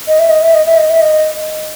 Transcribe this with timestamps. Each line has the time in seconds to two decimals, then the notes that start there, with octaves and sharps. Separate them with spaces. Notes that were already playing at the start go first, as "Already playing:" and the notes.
0.08 D#5
0.19 E5
0.30 D#5
0.42 E5
0.54 D#5
0.66 E5
0.77 D#5
0.90 E5
1.01 D#5